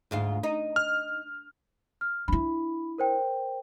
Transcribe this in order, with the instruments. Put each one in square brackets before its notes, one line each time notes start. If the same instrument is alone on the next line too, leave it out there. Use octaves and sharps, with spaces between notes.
[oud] D2 G#2 F4
D#4
[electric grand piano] F6
[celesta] F6
[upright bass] D4 E4 [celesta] B5
[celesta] A#4 C5 G5